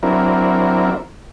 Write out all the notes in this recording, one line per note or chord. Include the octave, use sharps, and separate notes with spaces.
F#3 C4 D4 E4 A#4